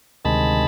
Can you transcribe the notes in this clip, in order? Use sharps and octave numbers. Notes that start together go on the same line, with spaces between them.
D2 C3 D#3 G#3 A5 B5